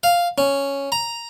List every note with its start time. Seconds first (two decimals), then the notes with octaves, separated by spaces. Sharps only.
0.03 F5
0.38 C#4
0.92 A#5